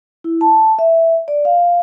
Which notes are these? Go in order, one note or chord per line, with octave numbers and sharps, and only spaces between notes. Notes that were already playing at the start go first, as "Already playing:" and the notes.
E4
A5
E5
D5
F5